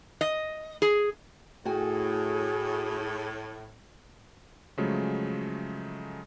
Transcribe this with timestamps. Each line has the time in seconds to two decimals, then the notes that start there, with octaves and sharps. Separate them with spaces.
0.21 D#5
0.82 G#4
1.65 A2 F#4 G#4 G5 G#5
4.78 C#3 F3 F#3 G#3 A3